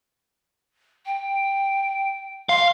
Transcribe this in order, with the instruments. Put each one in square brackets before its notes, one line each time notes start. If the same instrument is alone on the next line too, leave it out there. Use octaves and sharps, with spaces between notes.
[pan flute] G5
[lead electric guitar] F5 [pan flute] C6